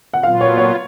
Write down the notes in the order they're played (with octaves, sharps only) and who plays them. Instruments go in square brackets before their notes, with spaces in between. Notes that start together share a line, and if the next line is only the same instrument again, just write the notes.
[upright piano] F#5
[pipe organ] A#2 F#3 B3 F4 [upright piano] F5
[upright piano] C#5
C#5